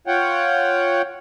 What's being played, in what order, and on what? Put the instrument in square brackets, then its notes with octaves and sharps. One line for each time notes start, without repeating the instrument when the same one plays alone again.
[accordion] F4 C#5 F#5 G5